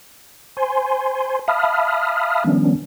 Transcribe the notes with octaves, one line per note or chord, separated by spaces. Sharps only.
C5 G#5 C6
E5 F5 A5 B5 D#6 F6
D#3 F3 G3 B3 C#4 D4